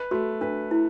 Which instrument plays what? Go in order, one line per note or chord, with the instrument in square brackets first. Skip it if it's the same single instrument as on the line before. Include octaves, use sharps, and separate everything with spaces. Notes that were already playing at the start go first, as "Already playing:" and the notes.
Already playing: [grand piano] B4
[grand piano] A3 [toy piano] F#4
[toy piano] D4 [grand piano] B4
[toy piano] E4